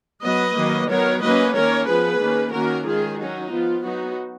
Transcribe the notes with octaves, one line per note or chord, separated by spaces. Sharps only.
F#3 B3 B4 D#5
D#3 F#3 A#3
D#3 F#3 B3 A#4 C#5
F#3 A#3 C#4 B4 D#5
D#3 A#3 C#4 A#4 C#5
F3 B3 G#4 B4
D#3 A#3 C#4
D#3 A#3 C#4 F#4 A#4
D#3 G#3 C#4 F4 G#4
F#3 C#4 D#4 F#4
F3 B3 F4
F#3 B3 D#4 F#4